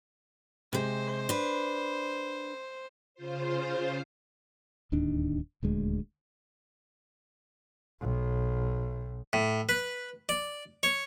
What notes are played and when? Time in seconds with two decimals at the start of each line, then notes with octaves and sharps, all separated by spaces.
0.73 C3 G#3 C5
1.29 D4 B4
3.14 C#3 F4 C5
4.92 D1 D#2 D#3 D4
5.63 D#1 D2 G#3
8.01 B1 B2
9.33 A2
9.69 B4
10.29 D5
10.83 C#5